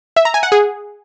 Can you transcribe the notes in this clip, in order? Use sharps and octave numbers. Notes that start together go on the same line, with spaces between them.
E5
A#5
G#5
F#5
G#4